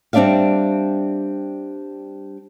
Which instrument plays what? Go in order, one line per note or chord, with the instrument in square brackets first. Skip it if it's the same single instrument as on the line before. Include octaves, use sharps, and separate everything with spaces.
[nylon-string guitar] G3 C4 D4 D5 E5 F5